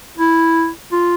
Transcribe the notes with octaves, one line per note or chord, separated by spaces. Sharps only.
E4
F4